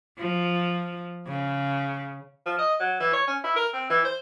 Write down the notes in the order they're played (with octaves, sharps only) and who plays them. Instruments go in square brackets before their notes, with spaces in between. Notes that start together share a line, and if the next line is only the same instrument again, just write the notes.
[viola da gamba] F3
C#3
[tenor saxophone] F3
D#5
F#3
E3
C#5
C#4
E4
A#4
C4
E3
C5